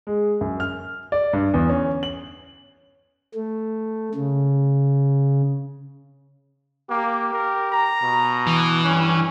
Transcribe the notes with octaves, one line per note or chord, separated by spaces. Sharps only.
G#3
F#2
F6
D5
G2
E2
C#4
F#7
A3
C#3
A#3 G4
A#4
A#5
B2
E3
G2 C#4